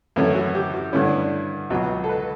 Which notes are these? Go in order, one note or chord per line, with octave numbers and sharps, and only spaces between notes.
F#2 E3 A3 C#4 E4
F#4
G4
F#4
G2 D3 A3 C#4 E4
D4
C#2 B2 F#3
A4
B4